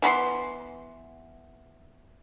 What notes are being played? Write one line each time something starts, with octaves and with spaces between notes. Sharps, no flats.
E3 B3 B5 C6